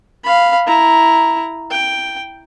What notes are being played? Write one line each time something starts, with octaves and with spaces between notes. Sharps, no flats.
F5 B5
E4 A#5
G5